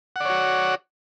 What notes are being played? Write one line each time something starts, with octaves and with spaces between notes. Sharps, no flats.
F#4 C#5 D5 F#5